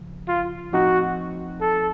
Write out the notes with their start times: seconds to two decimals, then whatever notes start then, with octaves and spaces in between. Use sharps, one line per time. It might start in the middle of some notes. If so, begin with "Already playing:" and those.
Already playing: C#3 F3
0.28 F4
0.72 A2 F3 C4 D#4 F#4
1.61 A4